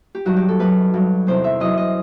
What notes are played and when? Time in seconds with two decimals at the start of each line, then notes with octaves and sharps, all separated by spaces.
0.15 G4
0.25 G2 D#3 F#3 F#4
0.36 G4
0.48 A4
0.59 F#2 F#3 B4
0.94 G2 F#3
1.27 E2 C3 D#3 C5
1.44 E5
1.60 F#2 E3 D#5
1.77 D#5